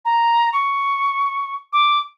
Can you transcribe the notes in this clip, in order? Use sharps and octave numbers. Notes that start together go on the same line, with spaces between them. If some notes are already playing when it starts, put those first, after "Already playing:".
A#5
C#6
D6